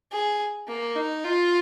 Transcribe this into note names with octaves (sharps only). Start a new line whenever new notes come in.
G#4
A#3
D#4
F4